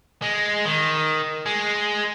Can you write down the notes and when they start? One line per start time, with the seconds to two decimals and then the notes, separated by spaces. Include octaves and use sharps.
0.22 G#3
0.65 D#3
1.46 G#3